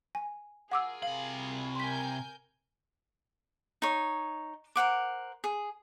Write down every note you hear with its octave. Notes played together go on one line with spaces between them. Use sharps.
G#5
F4 G#4 A#4 F#5 D6 E6
C3 F5 B5
A#4 G#5 C6 G6 B6
D#4 C#5
A#4 C5 F#5 D6
G#4